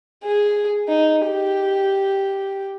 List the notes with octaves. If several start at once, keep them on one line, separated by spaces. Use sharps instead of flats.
G#4
D#4
G4